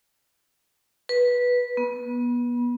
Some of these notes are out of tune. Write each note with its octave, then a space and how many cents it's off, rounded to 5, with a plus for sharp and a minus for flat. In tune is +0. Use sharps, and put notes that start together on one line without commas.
B4 -10
B3 -30